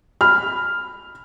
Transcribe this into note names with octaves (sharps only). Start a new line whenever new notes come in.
B5 F6